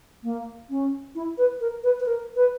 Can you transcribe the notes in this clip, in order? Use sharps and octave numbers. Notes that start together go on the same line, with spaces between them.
A#3
C#4
E4
B4
A#4
B4
B4
A#4
B4